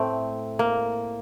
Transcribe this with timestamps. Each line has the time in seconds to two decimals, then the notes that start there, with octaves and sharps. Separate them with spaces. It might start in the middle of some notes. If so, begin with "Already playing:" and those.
Already playing: A2 A3 C4
0.59 A#3